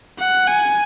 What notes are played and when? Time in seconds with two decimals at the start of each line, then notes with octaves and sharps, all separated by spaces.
0.20 F#5
0.48 G#5